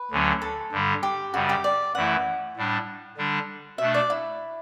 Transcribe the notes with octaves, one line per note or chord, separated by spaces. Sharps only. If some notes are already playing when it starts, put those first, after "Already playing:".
Already playing: B4
D2 D3 F#3 C#4
A4
G2 D3 G3
G4
F#2 C#3 G3 F#4
G4
D5
F#2 E3 A3 E4 F#5
A2 G3 D4
D3 G3 D4
B2 A3 D4 E5
D5
E4